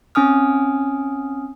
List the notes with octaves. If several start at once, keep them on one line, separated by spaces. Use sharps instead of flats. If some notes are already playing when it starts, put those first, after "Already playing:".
C4 C#4 G#5 D#6 F6